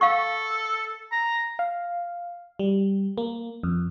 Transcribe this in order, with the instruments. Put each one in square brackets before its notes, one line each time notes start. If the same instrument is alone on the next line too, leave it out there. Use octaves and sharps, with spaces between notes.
[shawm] A4 [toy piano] F5 F#5 C#6
[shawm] A#5
[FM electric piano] F5
G3
A#3
F2